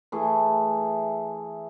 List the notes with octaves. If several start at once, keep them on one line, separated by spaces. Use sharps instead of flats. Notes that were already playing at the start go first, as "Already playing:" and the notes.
E3 A3 G#4